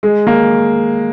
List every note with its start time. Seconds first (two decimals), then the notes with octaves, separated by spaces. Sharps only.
0.03 G#3
0.27 A#3